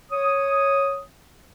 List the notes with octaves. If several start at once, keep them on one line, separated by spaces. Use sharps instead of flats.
C#5 D#6